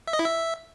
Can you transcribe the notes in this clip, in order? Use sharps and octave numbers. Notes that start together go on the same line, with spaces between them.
E5
D#5
E4
E5